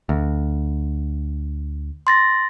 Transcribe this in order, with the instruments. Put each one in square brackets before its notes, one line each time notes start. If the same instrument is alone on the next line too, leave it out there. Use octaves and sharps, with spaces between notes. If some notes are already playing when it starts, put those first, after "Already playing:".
[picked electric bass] D2
[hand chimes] C6 A6 A#6